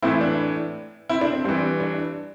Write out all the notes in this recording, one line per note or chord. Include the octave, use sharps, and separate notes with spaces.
A2 E3 C4 E4
D4
C4 E4
D4
C4
G2 E3 C4
D4